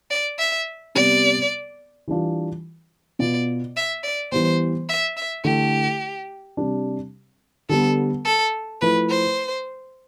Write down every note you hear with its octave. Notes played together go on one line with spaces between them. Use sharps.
D5
E5
C3 G3 B3 D5
E3 G3 D4 F4
B2 B3 F4 D5
E5
D5
E3 G3 B3 C5
E5
E5
D3 A3 E4 G4
C3 G3 D4
D3 G3 B3 A4
A4
F3 A3 E4 B4
C5